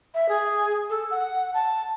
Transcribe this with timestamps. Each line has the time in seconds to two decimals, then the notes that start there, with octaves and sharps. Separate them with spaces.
0.14 E5
0.29 G#4
0.90 A4
1.11 F#5
1.54 A5